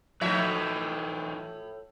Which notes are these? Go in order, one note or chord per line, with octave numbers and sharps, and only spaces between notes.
A2 E3 F3 D#4 E5